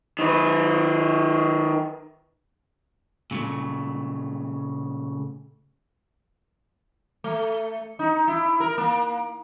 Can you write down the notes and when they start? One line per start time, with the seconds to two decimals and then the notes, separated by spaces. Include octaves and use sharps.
0.19 D#3 B4
3.31 A#2 C#3 A3
7.24 A3
7.99 D#4
8.28 E4
8.60 A#4
8.78 A#3